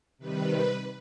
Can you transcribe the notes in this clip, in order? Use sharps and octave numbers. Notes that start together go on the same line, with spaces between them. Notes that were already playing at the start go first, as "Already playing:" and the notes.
C3 D#3 G3 B4